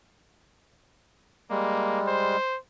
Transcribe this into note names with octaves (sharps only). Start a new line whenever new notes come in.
G3 G#3 A#3
C5